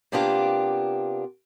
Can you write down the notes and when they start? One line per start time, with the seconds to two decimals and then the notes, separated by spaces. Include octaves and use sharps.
0.12 C3 A#3 B3 D4 F4 G4